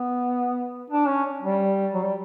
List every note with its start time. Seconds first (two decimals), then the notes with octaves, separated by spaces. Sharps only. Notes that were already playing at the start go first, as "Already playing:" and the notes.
Already playing: B3
0.90 D4
1.07 C#4
1.42 G3
1.94 F#3
2.04 G3